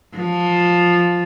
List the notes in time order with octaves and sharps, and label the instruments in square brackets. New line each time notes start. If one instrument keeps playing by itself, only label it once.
[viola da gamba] F3